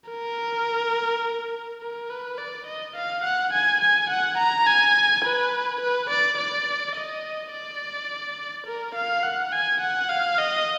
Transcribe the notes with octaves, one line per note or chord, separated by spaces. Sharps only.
A#4
A#4
B4
D5
D#5
F5
F#5
G#5
G#5
F#5
A#5
G#5
B4
B4
D5
D5
D#5
D5
A#4
F5
F#5
G#5
F#5
F5
D#5